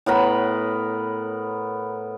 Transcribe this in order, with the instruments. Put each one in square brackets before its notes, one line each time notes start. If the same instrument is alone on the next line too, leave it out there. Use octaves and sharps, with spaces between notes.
[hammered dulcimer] A2 B3 A#4 B5